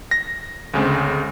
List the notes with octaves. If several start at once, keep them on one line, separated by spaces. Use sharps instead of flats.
A#6
D2 C#3 G#3 C4